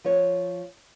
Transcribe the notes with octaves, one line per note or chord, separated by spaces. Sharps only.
F3 C#5